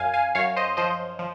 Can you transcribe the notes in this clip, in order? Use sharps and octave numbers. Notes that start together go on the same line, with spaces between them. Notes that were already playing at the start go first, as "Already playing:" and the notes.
Already playing: F#2 F5 G#5
F5 G#5
F#2 C#5 F5
C5 D#5
F3 C5 D#5
F3